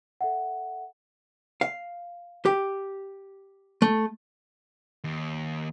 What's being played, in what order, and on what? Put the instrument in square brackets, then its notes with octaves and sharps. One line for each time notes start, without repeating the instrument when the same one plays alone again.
[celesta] A4 E5 F#5
[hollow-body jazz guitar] F5
G4
A3
[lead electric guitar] D#2